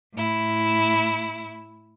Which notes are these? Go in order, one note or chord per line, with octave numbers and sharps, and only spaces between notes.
A2 E4